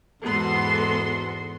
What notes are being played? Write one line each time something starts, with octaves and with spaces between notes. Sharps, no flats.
E2 G#2 B3 F#4 A4 C6